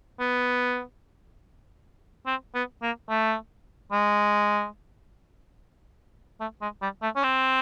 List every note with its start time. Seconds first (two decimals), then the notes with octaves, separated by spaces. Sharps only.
0.20 B3
2.26 C4
2.54 B3
2.83 A#3
3.10 A3
3.92 G#3
6.40 A3
6.61 G#3
6.82 G3
7.02 A3
7.16 C#4
7.24 C4